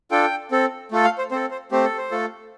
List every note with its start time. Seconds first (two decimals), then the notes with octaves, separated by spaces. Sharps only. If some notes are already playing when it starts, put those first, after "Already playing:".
0.11 D4 F4 A4 G5
0.51 C4 A4
0.92 A3 F4 A4
1.04 F5
1.18 C5
1.31 C4 A4 C5
1.51 C5
1.72 A3 C4 G4 C5
1.84 A4
1.98 C5
2.11 A3 F4 A4